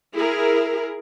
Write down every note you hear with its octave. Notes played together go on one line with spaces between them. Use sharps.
E4 G#4 A#4